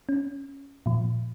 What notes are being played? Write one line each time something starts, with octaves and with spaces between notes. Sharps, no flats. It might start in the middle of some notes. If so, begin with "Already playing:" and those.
C#4
A#2 F3